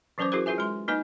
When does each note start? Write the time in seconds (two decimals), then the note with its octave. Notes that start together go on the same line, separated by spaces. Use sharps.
0.18 E3 F#3 C#4 B4 C5 D6
0.32 E4 F#4 G#4 A#4 C5
0.46 F4 G#4 B4 E5 G#5
0.58 G#3 C6
0.88 A#3 D#4 B4 D#5 G#5